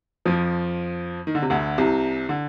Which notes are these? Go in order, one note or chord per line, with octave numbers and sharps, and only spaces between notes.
F2 F3
D#3
D3
C3
D2 D3
C2 C3
D3